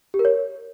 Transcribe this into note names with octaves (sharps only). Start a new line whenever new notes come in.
G4
A#4
C#5